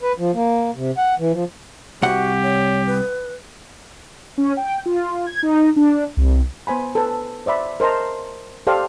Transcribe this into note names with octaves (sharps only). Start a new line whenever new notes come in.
B4
F3
A#3
C3
F#5
E3
F3
C2 F#4 G4 F#5
C#5
B4
C#4
G5
F4
G#6
D#4
D4
C2
B3 C5 G#5 B5
A4 B4
C5 D5 E5 B5
A#4 C5 D#5 A5 A#5
G4 A4 C5 D5 F5 G5